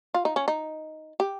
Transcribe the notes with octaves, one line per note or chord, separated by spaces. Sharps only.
F4
D#4
C#4
D#4
G4